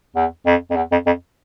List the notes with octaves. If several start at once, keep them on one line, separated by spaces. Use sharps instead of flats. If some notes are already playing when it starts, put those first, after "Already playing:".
E2
F2
F2
E2
F2
F2